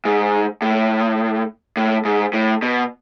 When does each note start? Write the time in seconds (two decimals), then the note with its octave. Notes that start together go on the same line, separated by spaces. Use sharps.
0.05 G#2
0.62 A2
1.77 A2
2.05 G#2
2.33 A2
2.62 B2